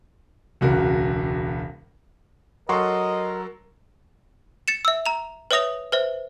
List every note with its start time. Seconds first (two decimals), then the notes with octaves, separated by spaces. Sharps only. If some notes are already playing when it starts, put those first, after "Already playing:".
0.61 E1 C#2 F#4 A#4
2.69 F#3 A4 A#4 D#5 F#5 C6 C#6
4.68 A6 C#7 E7
4.85 E5 E6
5.06 A#5 F7
5.51 B4 C#5 E5 D#6 A#6 F7
5.92 B4 C5 E5